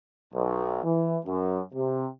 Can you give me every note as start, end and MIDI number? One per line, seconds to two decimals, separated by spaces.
0.34 0.81 35
0.84 1.17 52
1.26 1.60 42
1.74 2.07 48